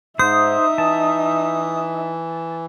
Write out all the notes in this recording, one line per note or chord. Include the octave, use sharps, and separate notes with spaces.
G#2 D#4 C5 E5 D#6
E3 A5